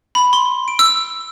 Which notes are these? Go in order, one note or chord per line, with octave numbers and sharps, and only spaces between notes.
B5
C6
D7
E6